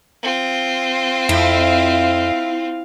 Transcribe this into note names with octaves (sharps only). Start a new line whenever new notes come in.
C4 F4
F2 E4 F5